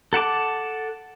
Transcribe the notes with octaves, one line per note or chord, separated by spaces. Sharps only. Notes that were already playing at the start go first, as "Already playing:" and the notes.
A4 F#5 A5 D6